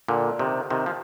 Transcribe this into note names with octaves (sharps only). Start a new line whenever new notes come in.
A#2 D3
C3 D#3
C3 D#3
F3